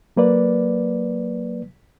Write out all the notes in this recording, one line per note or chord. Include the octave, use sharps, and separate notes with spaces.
F#3 A#3 B4 D5